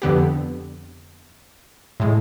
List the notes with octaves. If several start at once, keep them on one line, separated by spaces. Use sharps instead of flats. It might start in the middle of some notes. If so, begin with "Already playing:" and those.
F2 D3 B3 G4
A2 G#3